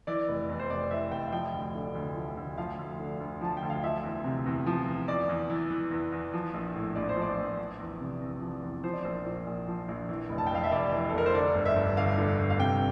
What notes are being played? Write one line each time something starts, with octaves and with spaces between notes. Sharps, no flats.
E3 D5
F1
E2
C5
F1 D5
E3 E5
F1 G5
F5
F3 G5
D2
D3
D2
F3
D2
F3 F5
D2
D3
D2
F3 A5
G5
D2
F5
F3 E5
E2
C3
E2
F3
E2
E2 D5
E2
E3
E3
E2
E2
F3
A#1
A2
A#1 D5
C5
F3 D5
A#1
F3
E2
C3
E2
F3
E2
F3 C5
D5
A#1 C5
A#2
A#1
F3
A#1
E3
F1
A5
G5
F2 F5
E5
F1 D5
E3
A4
F1 A#4
C5
D3 D5
G1
E5
G2
G1 F5
D3
G1
F5
C3 G5